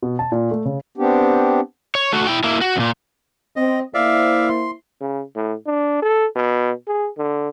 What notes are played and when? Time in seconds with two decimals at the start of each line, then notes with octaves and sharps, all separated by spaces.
0.02 B2
0.19 A5
0.32 A#2
0.51 A3
0.65 C#3
0.98 B3 C4 D4 G4
1.95 C#5
2.13 A3 F#4
2.27 E4 G5
2.44 A#3 E4
2.61 F#4
2.76 E2 A#2
3.56 C4 D#5
3.94 A#3 E4 C5 D5 E5 F5
4.49 C6
5.01 C#3
5.36 A2
5.66 D4
6.02 A4
6.36 B2
6.87 G#4
7.18 D3